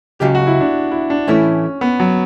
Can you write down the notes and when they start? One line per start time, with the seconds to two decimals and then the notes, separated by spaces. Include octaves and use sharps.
0.20 C#2 C#3 F#3 G4
0.35 F#4
0.47 E4
0.60 D4
0.92 E4
1.10 D4
1.27 A2 E3 A3 C#4 E4
1.81 B3
2.00 F#3